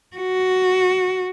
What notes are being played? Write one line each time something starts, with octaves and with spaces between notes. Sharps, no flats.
F#4